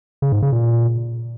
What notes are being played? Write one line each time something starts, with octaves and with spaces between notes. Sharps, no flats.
C#3
G#2
C#3
A#2